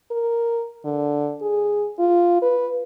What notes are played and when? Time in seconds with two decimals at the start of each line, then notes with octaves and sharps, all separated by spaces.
0.11 A#4
0.85 D3
1.42 G#4
1.99 F4
2.42 B4